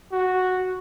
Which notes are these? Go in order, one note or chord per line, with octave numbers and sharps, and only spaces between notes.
F#4